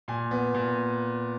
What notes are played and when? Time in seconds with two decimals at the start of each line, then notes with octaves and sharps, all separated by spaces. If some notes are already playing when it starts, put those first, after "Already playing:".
0.08 A#2 G#5
0.31 B3
0.55 A#2